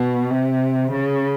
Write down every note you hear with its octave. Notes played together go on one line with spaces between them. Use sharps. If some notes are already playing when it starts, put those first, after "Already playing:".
Already playing: B2
C3
C#3